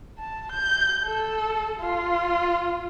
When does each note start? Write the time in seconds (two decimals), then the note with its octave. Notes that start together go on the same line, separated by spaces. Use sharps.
0.18 A5
0.52 G6
1.05 A4
1.81 F4